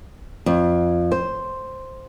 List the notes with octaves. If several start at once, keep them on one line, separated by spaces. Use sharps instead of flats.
F2
C5